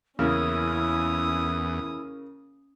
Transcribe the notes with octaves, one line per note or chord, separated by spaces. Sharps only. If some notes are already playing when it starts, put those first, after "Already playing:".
E2 C#3 A#3 C#4 E4 D#6